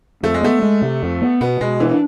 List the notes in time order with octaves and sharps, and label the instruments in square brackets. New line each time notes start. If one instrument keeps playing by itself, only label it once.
[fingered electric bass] F2 [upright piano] A3
[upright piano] G#3
[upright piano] A3 [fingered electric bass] B3
[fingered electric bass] G#3
C3
F2
B3
[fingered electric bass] B2 [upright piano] B3
[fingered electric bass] B2 [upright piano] G#3
[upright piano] E3 [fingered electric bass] D4